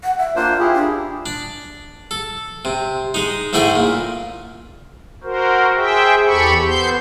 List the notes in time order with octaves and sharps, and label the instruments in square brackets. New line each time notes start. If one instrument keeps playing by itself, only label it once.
[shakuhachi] F#5
E5
[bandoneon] A#3 D4 C5 [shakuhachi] F4
[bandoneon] E4 G4 G#4
[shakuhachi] D4
[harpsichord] D4
A4
C3
G#3 D#4
G#2 A3 E4 G#4 G5
A#2
[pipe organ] F#4 A#4 C5
G#4 C5 E5 G5
E2 G4 A4 B5 C#6
B3 C5 C6 G6